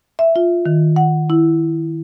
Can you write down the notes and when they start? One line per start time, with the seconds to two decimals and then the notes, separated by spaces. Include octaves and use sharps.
0.19 E5
0.36 F4
0.66 D#3
0.96 F#5
1.30 E4